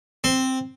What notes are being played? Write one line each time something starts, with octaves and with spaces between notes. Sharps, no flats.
C4